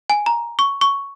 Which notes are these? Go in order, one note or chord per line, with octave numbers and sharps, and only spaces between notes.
G#5
A#5
C#6
C#6